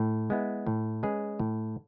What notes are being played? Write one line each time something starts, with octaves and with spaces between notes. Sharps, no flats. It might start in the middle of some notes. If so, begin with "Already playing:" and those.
Already playing: A2
G#3 B3 E4
A2
G#3 C#4 G#4 B4
A2